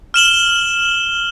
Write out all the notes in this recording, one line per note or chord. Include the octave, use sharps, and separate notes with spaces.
F6 E7 F#7 G7